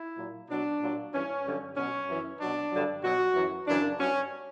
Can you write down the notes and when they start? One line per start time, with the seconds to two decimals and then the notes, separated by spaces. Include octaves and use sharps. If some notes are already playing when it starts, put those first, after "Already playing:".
Already playing: E4
0.17 A#2 F#3
0.48 B2 F#3 D4
0.80 A#2 F#3
1.12 G2 E3 C#4
1.44 G2 D3 F#3
1.75 B2 F#3 C#4
2.07 F#2 E3
2.39 B2 F#3 D4
2.71 G2 D3 F#3
3.02 B2 F#3 F#4
3.34 F#2 E3
3.66 F#2 C#3 E3 D4
3.97 G2 F#3 C#4